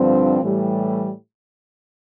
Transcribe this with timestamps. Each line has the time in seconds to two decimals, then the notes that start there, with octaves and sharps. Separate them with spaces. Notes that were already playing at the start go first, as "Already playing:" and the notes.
Already playing: G2 D3 F3 C4
0.41 A2 E3 G3